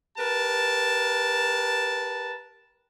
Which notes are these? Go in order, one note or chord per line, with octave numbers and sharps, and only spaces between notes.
G4 A#4 B4 A5